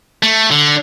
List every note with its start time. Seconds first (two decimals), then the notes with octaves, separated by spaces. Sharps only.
0.23 A3
0.51 D3